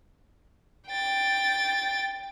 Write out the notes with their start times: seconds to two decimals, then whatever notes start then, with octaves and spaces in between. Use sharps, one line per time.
0.89 G5 A6